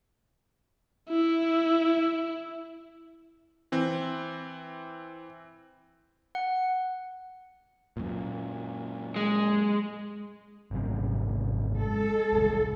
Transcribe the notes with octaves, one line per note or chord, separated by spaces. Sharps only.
E4
E3 C4
F#5
F#2 A#2
G#3
G#1 F#2 C3
G#3 A4
F#1 C2